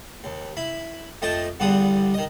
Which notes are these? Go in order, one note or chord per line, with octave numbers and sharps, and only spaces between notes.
D#2
E4 B5
F2 A3 D#5 G5 A5
E2 G2 D3 G3 F#5 D#6
D#3 D#5